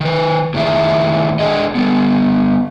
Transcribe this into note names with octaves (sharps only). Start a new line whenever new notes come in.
D#3 B4
A2 D#3 A#3 G#4 E5
D4 G#4 D#5
G3 B3